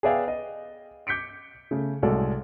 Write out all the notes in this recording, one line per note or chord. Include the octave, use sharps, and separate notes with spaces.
G#4 B4 D5 E5 F5 G5
D#5
D6 G6 B6 C#7 D7
C#3 A3
C2 A2 G#3 F#4 A4 D5